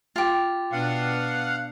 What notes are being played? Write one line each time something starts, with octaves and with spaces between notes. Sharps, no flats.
F4 G4
B2 B3 D4 F5 F#5